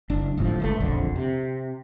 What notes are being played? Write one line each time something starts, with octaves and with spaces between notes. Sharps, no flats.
F#1 D4
D1 G1 A2 F3
G1 C#2 A3
E1 A#1 F2 D3
C3